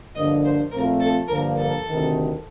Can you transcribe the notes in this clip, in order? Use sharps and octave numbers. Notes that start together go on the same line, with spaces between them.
G2 D3 F3 A#3 D4 D#5
C5
A#2 F3 A3 C4 F4 A#4
A4
G2 D3 F3 A#3 A#4
A4
D2 C3 D#3